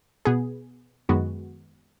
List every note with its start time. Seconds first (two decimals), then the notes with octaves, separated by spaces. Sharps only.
0.25 B2 B3 G#4
1.09 F#2 D#3 G#3 B3 F#4